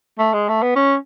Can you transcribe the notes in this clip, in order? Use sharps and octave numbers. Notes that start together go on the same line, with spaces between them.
A3
G#3
A3
B3
C#4